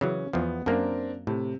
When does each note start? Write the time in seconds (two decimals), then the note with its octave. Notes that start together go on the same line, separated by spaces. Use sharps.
0.01 C#3 E3 F#3 C#4
0.33 E2 F3 B3
0.66 F#2 A#3 C4 D4 A#4
1.27 A2 C3